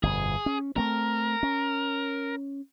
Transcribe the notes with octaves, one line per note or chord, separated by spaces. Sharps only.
G1 F2 B2 G#4
C#4
A3 A#3 C4 A#4
C#4